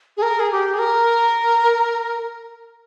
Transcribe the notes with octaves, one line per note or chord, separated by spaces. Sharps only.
G#4
A#4
G#4
G4
G#4
A#4